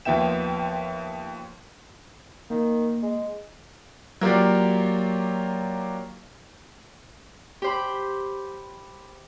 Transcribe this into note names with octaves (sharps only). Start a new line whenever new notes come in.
D#2 F3 B3 E5 G5 E7
D#3 A#3
G#3
F#3 A#3 F4 G4 D5
G4 C5 B5